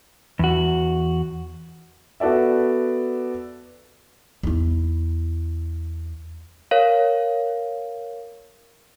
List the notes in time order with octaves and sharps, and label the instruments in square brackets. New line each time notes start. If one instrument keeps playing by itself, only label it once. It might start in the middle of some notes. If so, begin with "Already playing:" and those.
[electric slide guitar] E2 F#4
[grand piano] B3 F#4 A4 D5 E5
[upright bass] E2 E4
[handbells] A#4 C#5 F5